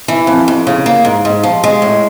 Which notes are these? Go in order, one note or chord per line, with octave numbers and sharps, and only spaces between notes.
E3
F2
F2
C#3
A#3
G#2
G#2
F3
G#3
A2